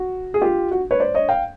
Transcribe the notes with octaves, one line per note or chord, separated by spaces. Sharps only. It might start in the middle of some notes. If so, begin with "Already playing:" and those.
Already playing: F#4
G#4
F4 G4
F#4
B4 C#5
C5 D5
C#5 D#5
F5 G5